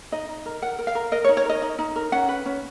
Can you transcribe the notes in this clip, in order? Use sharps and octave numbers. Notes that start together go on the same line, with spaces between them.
D#4 D#5
D#4
A#4
A#4 F#5
A#4
F5
A#4
A#4 D#5
C#5
D#4
C#5
A#4 D#5
D#4
D#4
A#4
C#4 F#5
B4
C#4